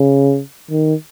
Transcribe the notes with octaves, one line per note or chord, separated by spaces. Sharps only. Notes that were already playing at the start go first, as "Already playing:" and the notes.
Already playing: C#3
D#3